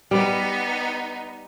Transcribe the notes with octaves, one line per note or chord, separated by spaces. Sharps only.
G3 B3 D#4